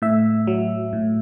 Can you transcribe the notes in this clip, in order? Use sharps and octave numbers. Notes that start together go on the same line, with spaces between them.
A2 E5
F#3
A2